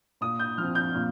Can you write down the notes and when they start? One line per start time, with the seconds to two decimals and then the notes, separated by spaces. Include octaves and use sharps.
0.21 A#2 D#6
0.39 G6
0.58 F3 C4 F6
0.75 G6
0.95 A#2